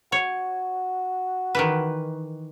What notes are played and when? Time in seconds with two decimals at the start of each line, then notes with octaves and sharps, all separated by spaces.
0.12 F#4 C#5
1.55 D#3 E3 B4